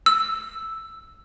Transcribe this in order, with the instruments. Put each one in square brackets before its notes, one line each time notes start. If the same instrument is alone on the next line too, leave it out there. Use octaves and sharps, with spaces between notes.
[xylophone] E6